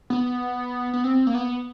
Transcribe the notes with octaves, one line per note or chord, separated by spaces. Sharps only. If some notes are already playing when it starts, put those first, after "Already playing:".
B3
B3
C4
A#3
B3